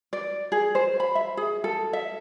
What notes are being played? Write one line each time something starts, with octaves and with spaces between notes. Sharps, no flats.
D5
G#4
C5
B5
E5
G#4
A4
E5